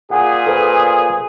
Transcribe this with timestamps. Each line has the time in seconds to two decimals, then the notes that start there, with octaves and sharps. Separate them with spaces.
0.11 A#2 G#4 F#5 G#5
0.47 A4 B4 C5